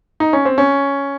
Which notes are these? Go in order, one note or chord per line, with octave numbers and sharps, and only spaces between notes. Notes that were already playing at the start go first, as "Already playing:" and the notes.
D#4
C#4
C4
C#4